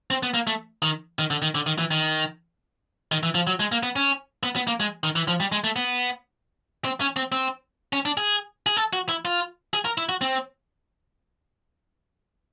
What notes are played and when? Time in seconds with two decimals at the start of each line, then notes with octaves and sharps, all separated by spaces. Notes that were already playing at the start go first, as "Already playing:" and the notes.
0.11 C4
0.23 B3
0.34 A#3
0.47 A3
0.82 D#3
1.19 D#3
1.31 D3
1.42 D#3
1.55 D3
1.66 D#3
1.78 E3
1.91 D#3
3.12 D#3
3.23 E3
3.35 F3
3.47 F#3
3.60 G#3
3.72 A#3
3.83 B3
3.96 C#4
4.43 B3
4.56 B3
4.67 A#3
4.80 G#3
5.04 D#3
5.16 E3
5.28 F3
5.40 G3
5.52 G#3
5.64 A3
5.76 B3
6.85 C4
7.01 C#4
7.16 C4
7.32 C4
7.93 C#4
8.05 D4
8.17 G#4
8.66 G#4
8.77 A4
8.93 F#4
9.09 E4
9.25 F4
9.74 G#4
9.85 A#4
9.98 E4
10.09 F#4
10.21 C4